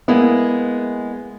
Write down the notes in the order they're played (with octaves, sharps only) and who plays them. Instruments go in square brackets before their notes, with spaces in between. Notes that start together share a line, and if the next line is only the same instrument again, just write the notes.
[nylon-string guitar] G#3 A#3 E4 [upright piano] B3